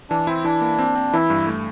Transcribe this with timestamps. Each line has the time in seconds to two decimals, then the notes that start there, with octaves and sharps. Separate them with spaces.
0.10 E3 D4
0.27 C4 E4
0.44 E3 D4
0.61 A#3
0.79 C4
0.95 C4
1.13 E3 E4
1.30 G2
1.47 A3